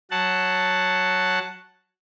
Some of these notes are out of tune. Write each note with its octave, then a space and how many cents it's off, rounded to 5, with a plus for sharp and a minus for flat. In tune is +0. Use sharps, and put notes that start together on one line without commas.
F#3 +0 F#5 +0 A5 +0